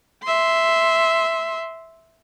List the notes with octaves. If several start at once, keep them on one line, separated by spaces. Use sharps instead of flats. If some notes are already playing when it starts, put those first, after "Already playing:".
E5 C6